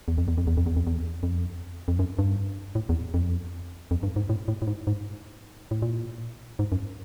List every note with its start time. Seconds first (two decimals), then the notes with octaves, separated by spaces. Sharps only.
0.08 E2
0.18 F2
0.28 E2
0.38 F2
0.47 E2
0.57 F2
0.66 E2
0.76 F2
0.87 E2
1.23 F2
1.88 F2
1.99 F#2
2.19 G2
2.75 A2
2.89 E2
3.14 F2
3.91 F2
4.03 G2
4.16 G#2
4.29 A2
4.48 A2
4.62 A2
4.67 G#2
4.87 G#2
5.71 A2
5.82 A#2
6.59 G#2
6.72 F#2